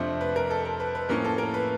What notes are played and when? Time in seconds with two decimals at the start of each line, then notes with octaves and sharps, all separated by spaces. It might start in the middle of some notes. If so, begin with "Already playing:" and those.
Already playing: F2 C3 F3 A3 D4 C5
0.21 B4
0.36 A#4
0.50 A4
0.65 A#4
0.80 B4
0.95 B4
1.09 A2 F3 A#3 C#4 A#4
1.25 A4
1.38 A#4
1.54 B4